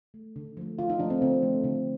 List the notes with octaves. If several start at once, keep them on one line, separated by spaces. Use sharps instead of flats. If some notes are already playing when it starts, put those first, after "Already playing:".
A3
D3
F3 A3
D3 F4
D#4
F3 A3 D4
C4
D3 C4
F3 A3
D3